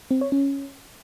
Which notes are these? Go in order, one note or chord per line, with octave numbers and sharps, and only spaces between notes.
C4
C#5
C#4